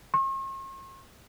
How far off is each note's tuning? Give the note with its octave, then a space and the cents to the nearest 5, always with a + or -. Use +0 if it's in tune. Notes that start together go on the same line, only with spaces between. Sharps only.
C#6 -45